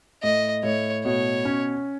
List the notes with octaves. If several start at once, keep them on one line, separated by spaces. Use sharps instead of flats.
A2 D#5
A2 C#5
B2 C#5
C#4